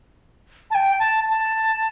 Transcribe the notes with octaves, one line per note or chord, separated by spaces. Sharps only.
A5
G5
A5
A5